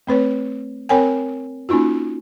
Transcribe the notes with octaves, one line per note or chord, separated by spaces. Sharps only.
A3 C4 B4 C#5
C4 A#4 C#5 G5 G#5
A#3 C#4 D#4 F4 F#4